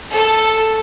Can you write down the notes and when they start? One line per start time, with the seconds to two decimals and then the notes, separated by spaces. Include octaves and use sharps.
0.14 A4